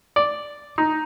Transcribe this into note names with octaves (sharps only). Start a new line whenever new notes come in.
D5
D#4